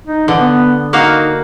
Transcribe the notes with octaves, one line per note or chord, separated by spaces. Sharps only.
D#4
D3 E3
B3
A#3 D#4 F#4 F5